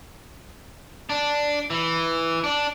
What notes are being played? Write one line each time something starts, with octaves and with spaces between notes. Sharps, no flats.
D4
E3
D4